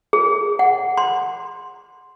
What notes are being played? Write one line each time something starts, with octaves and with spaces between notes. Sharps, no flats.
G#4
F#5
C6